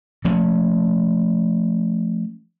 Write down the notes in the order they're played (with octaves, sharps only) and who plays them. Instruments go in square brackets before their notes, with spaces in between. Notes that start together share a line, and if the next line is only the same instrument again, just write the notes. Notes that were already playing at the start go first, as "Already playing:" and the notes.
[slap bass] F3 A3 C#4